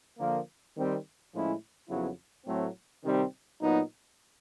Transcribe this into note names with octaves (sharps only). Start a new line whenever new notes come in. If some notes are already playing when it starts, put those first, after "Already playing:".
D3 F3 A#3
D#3 G3 C4
A2 F3 G#3 C#4 E4
F2 C#3 F#3 B3 E4
A2 F#3 A3 C4
C3 D#3 G3 C4 D#4
A#2 F#3 B3 D#4